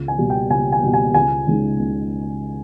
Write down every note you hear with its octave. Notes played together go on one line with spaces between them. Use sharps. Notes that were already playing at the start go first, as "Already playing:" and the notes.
Already playing: C#2
G#5
B2 G3
G5
C#2 G#5
G#5
B2 G3
G#5
C#2 G#5
C#3 G#3 D#4
C#2